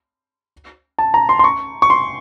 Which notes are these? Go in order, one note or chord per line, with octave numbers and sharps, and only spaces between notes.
A5
A#5
C6
C6
C#6
C#6
C6